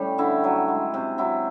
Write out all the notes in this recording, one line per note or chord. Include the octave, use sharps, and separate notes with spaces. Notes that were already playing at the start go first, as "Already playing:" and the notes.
Already playing: A2 G3 A3 C#4 G4
D3 E4
F#3
G#3
C3
F#3 E4